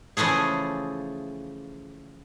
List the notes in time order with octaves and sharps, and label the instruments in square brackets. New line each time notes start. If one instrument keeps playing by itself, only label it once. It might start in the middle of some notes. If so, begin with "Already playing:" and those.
[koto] C#3 E3 F3 A3 G#4